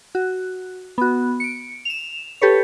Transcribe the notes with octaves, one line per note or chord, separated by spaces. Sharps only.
F#4
B3 F#4
C#7 D7
E7 F7
G4 A4 B4 C#5